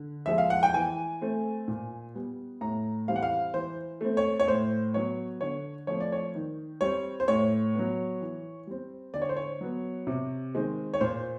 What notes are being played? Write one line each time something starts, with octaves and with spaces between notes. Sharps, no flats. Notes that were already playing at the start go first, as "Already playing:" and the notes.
Already playing: D3
F3 G#3 E5
F5
F#5
G5
E3 G#5
A3 C4
A#2
G3 B3
A2 A#5
E3 G3 C4 F5
F#5
F5
E3 C5
A3 C4
C#5
C#5
A2 C5
F#3 B3 C#5
D3 C#5
F3 A3 C4 C#5
D5
C#5
D#3
G3 C4 C#5
C5
A2 C#5
F#3 B3
E3
G3 C4
D3 D5
C#5
C5
C#5
F#3 B3
C3
D#3 G#3 C4
C#5
A#2 C5